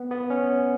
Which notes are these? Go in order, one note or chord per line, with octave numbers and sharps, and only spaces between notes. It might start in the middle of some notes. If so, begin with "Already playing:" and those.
Already playing: B3
B3
C#4